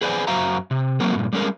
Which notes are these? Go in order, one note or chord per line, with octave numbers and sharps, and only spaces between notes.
G#4 B4 C5 D5 F#5 G#5
F#2 F#4 C5 E5 F5 A#5
C3
F#3 A3 A#3 C4 F#4 A#4
G2 A#2
G3 G#3 C#4 A4 A#4